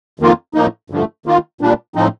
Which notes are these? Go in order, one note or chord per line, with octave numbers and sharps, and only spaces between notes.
F2 D#3 A#3 F4
A2 F3 A#3 D#4
G2 D3 F3 A3
D#3 A#3 F4
A#2 G3 D4
A2 F3 C4 D#4